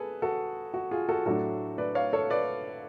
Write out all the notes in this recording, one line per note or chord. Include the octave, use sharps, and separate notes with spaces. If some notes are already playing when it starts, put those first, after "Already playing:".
Already playing: G#4 A4 B4
F#4 A4
F#4
F4 G#4
F#4 A4
A2 F#3 A3 D4 F#4 A4
B4 D5
C#5 F5
A4 C#5
B4 D5